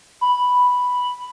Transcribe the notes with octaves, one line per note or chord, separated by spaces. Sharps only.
B5